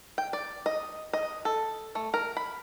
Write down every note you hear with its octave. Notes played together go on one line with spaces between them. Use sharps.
G5
D5
D#5
D#5
A4
A3
A#4
B5